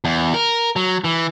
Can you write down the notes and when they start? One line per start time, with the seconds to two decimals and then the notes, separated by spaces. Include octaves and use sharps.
0.04 E2
0.34 A#4
0.76 F#3
1.04 E3